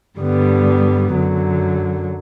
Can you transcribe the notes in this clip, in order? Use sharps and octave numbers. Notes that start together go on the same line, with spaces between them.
G2 D3 G3 B3
F#2 D3 F#3